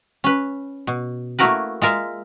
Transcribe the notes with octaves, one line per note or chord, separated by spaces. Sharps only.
C#4 B4
B2
A3 A#3 E4 F#4 A#4 B4
G#3 F4 A#4 E5